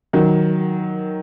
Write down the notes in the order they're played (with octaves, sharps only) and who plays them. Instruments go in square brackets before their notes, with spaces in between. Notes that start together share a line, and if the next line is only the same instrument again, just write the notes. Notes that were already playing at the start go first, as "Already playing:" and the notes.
[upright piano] D#3 F#3